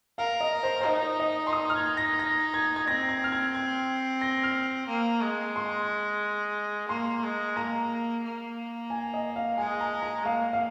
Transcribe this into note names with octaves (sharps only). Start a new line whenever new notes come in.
A#4 F5
D#5
C5
C5
D#4 D#5
D#5
C6
D#6
F6
G#6
A#6
A#6
G#6
G#6
C4 A#6
G#6
F6
G#6
G#6
A#6
F6
A#3
G#3
C6
A#3 C6
G#3
A#3 A#5
A#3
G#5
D#5
F5
G#3 G#5
A#5
A#5
A#3 F5
F5